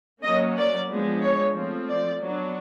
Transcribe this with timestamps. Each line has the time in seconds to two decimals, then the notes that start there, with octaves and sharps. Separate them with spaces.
0.23 F#3 A#3 C#4 D#5
0.57 D5
0.89 F3 G#3 B3 D4
1.21 C#5
1.55 F3 A3 C4
1.88 D5
2.20 F#3 B3 D4